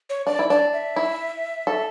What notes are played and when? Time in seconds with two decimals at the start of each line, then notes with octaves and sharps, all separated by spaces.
0.10 C#5
0.27 D4 D5
0.39 E4
0.50 D4 D5
0.73 E5
0.96 E4
1.67 A4